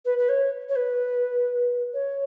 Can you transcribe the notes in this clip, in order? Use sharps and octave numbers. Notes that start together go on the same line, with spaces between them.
B4
B4
C#5
C#5
B4
C#5